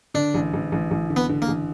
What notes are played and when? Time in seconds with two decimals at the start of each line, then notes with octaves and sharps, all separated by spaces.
0.14 D3 D4
0.34 A1
0.53 A1
0.72 A1
0.91 A1
1.10 D3
1.16 B3
1.29 D3
1.42 A#3
1.48 A1